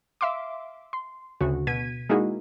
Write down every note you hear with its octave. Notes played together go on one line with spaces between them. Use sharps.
E5 F5 C6 D6
C6
D2 C#3 F#4
B2 G#6 B6 D#7
G#3 A#3 D#4 E4 F#4 G#4